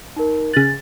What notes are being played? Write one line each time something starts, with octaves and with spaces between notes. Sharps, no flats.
D#4 A#4
C#3 F#6 A6